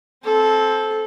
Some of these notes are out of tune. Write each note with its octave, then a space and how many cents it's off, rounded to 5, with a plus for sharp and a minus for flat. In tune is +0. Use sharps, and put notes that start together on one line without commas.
C4 +10 A4 -15